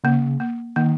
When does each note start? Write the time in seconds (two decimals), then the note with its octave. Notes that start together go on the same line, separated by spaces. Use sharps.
0.04 C#3 A#3
0.40 A#3
0.76 D#3 A#3